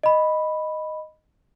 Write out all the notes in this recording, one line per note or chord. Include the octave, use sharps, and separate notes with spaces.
D#5 B5